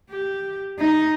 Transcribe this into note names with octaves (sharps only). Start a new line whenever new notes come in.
G4
D#4